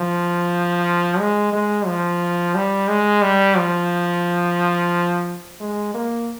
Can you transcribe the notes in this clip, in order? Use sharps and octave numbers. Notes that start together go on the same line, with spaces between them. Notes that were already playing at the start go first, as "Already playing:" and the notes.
Already playing: F3
G#3
G#3
F3
G3
G#3
G3
F3
G#3
A#3